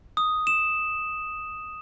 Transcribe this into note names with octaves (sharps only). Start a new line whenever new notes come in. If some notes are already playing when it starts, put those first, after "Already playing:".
D#6
E7